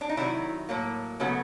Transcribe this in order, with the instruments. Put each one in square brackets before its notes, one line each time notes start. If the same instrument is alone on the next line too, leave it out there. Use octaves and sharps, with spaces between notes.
[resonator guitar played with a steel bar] D4
D#4
C3 D#3 F#3 E4
A2 F#3 A#3
C#3 F#3 A3 B3